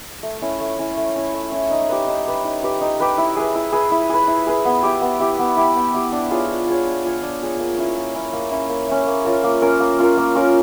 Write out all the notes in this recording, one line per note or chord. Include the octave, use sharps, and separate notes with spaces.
A3
C#4 E4
A3
C#4 E4
A3
C#4 E4
A3
C#4 E4
D#4
G4 B4
D#4
G4 B4
D#4
G4 B4
D#4
G4 B4
E4
G#4 B4
E4
G#4 B4
E4
G#4 B4
E4
G#4 B4
B3
E4 G4
B3
E4 G4
B3
E4 G4
B3
E4 G4
D4
F4 G#4 C#5
D4
F4 G#4 C#5
D4
F4 G#4 C#5
D4
F4 G#4 C#5
A#3
C#4 E4
A#3
C#4 E4
A#3
C#4 E4
A#3
C#4 E4
A#3
C#4 F4 A#4
A#3
C#4 F4 A#4
A#3
C#4 F4 A#4
A#3
C#4 F4 A#4